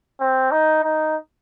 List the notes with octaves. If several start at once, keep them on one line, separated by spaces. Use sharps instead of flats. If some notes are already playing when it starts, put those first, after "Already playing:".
C4
D#4
D#4